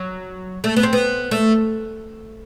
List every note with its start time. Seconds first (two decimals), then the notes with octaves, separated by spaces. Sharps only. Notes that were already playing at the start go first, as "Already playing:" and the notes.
Already playing: F#3
0.64 A3
0.76 B3
0.83 C4
0.93 B3
1.31 A3